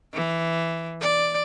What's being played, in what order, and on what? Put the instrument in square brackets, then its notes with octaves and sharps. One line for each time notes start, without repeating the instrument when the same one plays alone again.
[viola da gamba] E3
D5